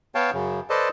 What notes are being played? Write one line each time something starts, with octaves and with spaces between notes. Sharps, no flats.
B3 C#5 F5 G5 A5
F#2 C#3
A4 B4 C5 D5 D#5 A5